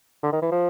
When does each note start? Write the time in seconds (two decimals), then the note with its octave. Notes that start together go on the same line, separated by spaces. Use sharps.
0.23 D3
0.33 D#3
0.42 E3
0.52 F3